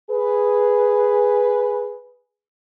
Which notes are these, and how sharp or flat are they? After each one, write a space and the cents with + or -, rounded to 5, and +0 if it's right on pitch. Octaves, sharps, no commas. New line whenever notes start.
G#4 +0 B4 +0